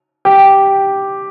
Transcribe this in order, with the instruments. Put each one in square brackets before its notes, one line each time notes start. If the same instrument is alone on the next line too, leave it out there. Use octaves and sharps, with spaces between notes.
[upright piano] G4